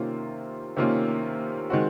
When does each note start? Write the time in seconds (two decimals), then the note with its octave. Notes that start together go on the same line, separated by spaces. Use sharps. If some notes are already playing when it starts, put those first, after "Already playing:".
Already playing: C3 D#3 A#3 C#4 F4
0.76 C3 D#3 A#3 C#4 F4
1.70 D#3 G#3 C4 F#4